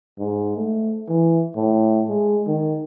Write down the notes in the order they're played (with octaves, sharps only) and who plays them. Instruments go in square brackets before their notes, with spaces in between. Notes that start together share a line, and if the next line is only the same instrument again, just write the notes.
[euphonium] G#2
A3
E3
A2
G#3
D#3